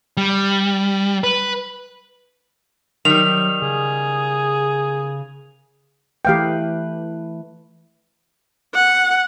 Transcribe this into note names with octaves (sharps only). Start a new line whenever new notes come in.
G3
B4
D#3 F#3 G3 F7
C#3 G#4
E3 A3 G4 B4 F5 G5
F#5